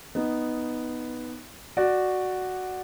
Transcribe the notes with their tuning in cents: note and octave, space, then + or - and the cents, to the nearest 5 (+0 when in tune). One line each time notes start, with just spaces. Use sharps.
B3 +0 D#4 +0
F#4 +0 D5 +10